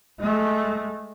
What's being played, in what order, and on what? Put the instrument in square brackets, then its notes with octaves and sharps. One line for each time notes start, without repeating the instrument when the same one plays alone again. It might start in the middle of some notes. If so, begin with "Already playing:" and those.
[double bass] G#3 A3